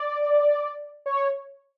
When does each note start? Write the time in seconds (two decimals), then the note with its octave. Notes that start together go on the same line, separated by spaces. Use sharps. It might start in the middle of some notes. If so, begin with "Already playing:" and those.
Already playing: D5
1.06 C#5